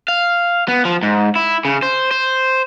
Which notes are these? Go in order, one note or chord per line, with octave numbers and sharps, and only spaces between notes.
F5
B3
F3
G#2
E4
C#3
C5
C5